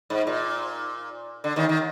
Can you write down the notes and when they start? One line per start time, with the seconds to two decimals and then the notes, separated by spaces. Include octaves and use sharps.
0.10 G#2
0.27 A#2
1.44 D3
1.56 D#2 D#3
1.69 D#3